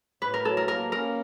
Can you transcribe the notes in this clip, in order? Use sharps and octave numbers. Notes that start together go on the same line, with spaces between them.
A2 B4
A#4
F#3 A4
A#4
A#3 A#4
C#4 A#4